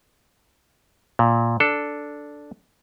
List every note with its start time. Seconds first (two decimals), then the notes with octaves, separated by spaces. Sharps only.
1.19 A#2
1.60 D4 A4